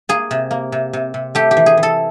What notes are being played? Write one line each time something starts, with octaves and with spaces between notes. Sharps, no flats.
A#3 G#4
C3
A#3
C3
C3
C3
A3 G4
G4
E3
G#4
E3
A4